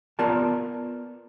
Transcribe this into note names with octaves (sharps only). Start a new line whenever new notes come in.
B3 F4 A#4 D5 A5